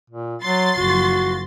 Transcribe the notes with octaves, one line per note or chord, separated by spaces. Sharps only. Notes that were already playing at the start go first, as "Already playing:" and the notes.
A#2
F#3 C6 A6
F#1 F3 F#4